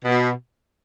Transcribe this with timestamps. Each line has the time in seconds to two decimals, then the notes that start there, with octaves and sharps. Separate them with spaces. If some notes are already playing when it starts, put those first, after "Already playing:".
0.05 B2